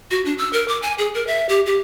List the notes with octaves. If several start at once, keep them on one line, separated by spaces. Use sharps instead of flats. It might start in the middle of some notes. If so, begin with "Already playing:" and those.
F#4
D4
E6
A#4
D6
G#5
G#4
A#4
E5
G4
G4